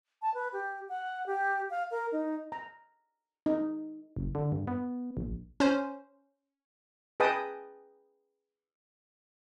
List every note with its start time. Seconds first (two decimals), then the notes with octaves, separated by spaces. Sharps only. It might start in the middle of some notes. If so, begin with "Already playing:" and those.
0.22 A5
0.34 B4
0.53 G4
0.89 F#5
1.26 G4
1.70 F5
1.91 A#4
2.12 D#4
2.52 A#5
3.46 D#4
4.16 F#1
4.35 D3
4.52 G2
4.68 B3
5.17 A#1
5.60 C#4 C5
7.20 G#4 B4 D#5 G5 A5 D#6